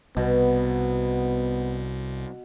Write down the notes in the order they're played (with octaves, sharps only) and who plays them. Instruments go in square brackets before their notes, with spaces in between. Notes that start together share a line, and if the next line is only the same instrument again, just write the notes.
[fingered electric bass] C2 [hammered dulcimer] B2 [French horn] B3